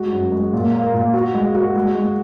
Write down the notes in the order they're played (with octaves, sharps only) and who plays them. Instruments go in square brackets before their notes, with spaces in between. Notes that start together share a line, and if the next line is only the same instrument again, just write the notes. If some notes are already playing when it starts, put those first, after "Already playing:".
Already playing: [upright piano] G#3 F#4
F#2
G#3
A#2
A#3
A#2
F#4
G#3
F#4
G#3
G#3